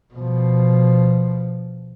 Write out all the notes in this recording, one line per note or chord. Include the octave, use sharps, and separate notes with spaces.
B2 F3